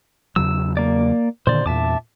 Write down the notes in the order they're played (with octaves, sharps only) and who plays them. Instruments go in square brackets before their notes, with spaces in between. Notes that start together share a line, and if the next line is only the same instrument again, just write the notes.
[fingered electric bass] E2 C#3 F#3 [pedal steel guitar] E6
[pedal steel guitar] A#3 D5
[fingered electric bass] A#2 D3 D#3 [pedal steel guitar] C5 D5
[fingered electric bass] E2 A#2 [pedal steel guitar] E5 A5 D6